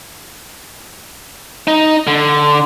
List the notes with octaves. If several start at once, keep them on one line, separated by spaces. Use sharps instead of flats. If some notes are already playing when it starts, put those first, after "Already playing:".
D#4
D3